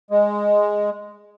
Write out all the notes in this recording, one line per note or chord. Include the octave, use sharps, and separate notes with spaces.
G#3